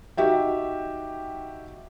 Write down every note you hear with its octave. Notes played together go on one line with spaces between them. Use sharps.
D#4 F#4 G4 E5 G5